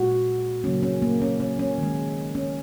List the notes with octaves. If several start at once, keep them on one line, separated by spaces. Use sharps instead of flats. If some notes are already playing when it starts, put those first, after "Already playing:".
Already playing: A#2 G#3 F#4
C#3 F#3 A#3 C#4
C#4
A#3
C#4
C#4
C#4
D#3
G#3
C#4